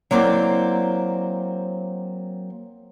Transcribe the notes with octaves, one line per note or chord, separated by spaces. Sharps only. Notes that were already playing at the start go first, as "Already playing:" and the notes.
F#3 A#3 C4 E4 C5 D5